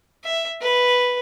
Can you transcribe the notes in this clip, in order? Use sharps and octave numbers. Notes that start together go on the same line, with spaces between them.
E5
B4